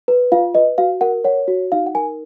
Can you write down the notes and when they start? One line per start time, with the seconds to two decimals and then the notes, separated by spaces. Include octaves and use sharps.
0.08 B4
0.32 F4 F5
0.55 B4 D#5
0.78 F#4 F5
1.01 A#4 F#5
1.24 C#5 F#5
1.48 F#4
1.72 D#4 F5
1.86 F#5
1.95 A#4 G#5